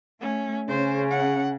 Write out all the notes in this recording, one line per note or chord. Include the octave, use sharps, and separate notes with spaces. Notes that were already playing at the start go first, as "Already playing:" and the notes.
A3 C#4
C#3 C#4 G#4 C5
F#5